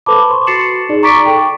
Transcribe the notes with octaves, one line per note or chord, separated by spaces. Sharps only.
A4 B4 C5 A5 B5 D6
C6 C#6
F#4 A6 C7 C#7 E7 F#7
D#4 G#4 D5
A#5 C#6 D6 A6 B6 D7
A4 G5 C#6